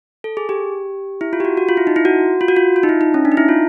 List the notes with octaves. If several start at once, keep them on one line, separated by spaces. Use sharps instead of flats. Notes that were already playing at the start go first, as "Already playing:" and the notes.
A4
G#4
G4
E4
F4
G4
F#4
F#4
F4
E4
D#4
E4
F#4
F4
F#4
F4
F4
D#4
E4
D#4
C#4
D4
D#4
E4
F4